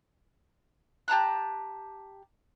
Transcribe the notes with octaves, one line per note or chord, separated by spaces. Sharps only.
G4 A5 A#5 F#6